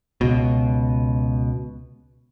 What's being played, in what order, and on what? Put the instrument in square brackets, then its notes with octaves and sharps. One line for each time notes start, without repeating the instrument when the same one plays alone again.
[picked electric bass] C#2 B2